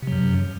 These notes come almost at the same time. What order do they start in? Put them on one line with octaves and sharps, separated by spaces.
C3 F#3 F#2